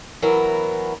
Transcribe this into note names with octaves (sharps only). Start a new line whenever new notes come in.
E3 F#3 B3 A#4